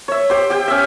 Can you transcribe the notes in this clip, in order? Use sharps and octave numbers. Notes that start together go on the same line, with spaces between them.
C#5 E5
G4 C5
G4 G5
C#4 E5